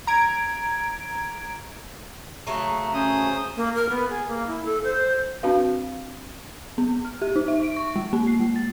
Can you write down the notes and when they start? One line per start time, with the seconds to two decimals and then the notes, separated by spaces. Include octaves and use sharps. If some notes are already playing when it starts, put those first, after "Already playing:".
0.07 A#5 G#6 D7
2.47 C#3 F#3 A3 A#5
2.94 C#4 C5 D#6
3.56 A#3
3.75 A#4
3.89 B3
4.10 G#4
4.28 A#3
4.47 E4
4.65 A4
4.84 C5
5.43 C4 D4 F#4 B4 F5
6.78 B3
7.05 F6
7.22 G4
7.36 D#4
7.48 E5
7.63 D7
7.76 C#6
7.96 G#3
8.13 A#3
8.27 C7
8.40 G#3
8.56 A6